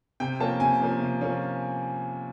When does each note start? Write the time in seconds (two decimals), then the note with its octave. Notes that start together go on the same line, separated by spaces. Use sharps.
0.20 C3 G5
0.40 F3 A#3 C#4 A5
0.60 C3 G#5
0.81 F3 A#3 C#4
1.01 C3
1.21 F3 A#3 C#4